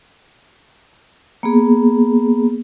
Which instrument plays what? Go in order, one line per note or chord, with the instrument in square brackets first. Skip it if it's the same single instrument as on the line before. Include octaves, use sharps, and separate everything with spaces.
[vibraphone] A#3 B3 G#4